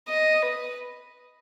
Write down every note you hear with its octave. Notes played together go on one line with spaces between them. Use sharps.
D#5
B4